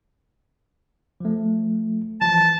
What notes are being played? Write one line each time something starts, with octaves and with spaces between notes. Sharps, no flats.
F3 A3
E3 F3 A5